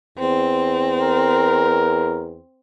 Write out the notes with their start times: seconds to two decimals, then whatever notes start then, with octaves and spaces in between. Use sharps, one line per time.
0.18 E2 C4
1.01 A#4